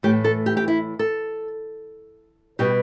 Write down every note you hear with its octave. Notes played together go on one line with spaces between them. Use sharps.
A2 E3 A3 G4
A4
G4
G4
E4
A4
B2 G3 B3 G4